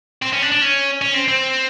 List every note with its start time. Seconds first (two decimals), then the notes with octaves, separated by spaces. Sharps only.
0.22 C4
0.33 C#4
0.42 D4
0.52 D4
0.61 C#4
1.01 C#4
1.14 C4
1.28 C4